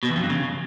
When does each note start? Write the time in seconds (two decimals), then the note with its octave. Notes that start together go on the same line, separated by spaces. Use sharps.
0.03 B2
0.09 E2
0.16 F2
0.23 G2
0.30 C#3